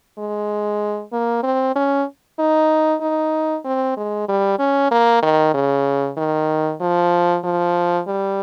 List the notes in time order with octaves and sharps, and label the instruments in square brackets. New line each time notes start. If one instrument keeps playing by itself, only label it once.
[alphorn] G#3
A#3
C4
C#4
D#4
D#4
C4
G#3
G3
C#4
A#3
D#3
C#3
D#3
F3
F3
G3